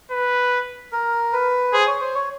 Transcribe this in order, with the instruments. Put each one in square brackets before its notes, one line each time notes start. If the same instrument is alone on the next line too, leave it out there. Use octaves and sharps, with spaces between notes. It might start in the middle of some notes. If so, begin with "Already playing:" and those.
[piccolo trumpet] B4
[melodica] A#4
B4
[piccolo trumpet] G#4 [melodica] C5
[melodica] C#5
C5
C#5